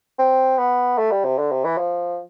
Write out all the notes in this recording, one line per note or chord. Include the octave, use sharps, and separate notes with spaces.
C4
B3
A3
G3
C3
D3
C3
E3
F3